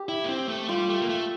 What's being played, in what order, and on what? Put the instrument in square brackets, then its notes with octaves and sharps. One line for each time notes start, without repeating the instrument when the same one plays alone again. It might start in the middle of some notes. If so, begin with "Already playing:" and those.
Already playing: [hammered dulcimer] G4
[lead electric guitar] E4
A#3
C4
A3
[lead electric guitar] G3 [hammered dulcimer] F4
[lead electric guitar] A3
A#3
A3